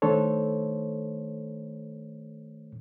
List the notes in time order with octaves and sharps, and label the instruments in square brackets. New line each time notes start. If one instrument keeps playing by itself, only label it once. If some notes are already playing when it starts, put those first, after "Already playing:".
[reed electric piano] D#3 A3 D4 A4 C5 C#5